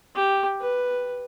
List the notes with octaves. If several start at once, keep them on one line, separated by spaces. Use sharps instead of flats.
G4
B4